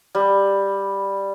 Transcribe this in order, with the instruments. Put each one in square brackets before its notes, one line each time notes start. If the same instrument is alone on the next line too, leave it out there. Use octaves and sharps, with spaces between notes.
[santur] G3